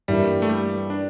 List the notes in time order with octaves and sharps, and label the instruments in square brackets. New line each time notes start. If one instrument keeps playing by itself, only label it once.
[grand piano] G2 E3 A#3 E4 [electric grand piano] G3
[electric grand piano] A3
G3
D4